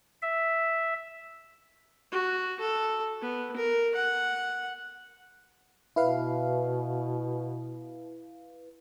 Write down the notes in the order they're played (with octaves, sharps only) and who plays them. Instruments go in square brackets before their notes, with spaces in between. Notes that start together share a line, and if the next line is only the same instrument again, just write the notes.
[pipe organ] E5
[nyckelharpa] F#4
A4
B3
A#4
F#5
[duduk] B2 [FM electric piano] E4 B4 F5